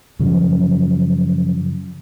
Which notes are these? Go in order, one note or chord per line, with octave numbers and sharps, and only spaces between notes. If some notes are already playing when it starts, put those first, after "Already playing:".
F#2 C#3 F3